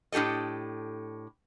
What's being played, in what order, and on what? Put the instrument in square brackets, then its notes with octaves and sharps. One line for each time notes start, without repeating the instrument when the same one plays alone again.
[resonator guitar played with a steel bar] A2 D4 G4 A4 D#5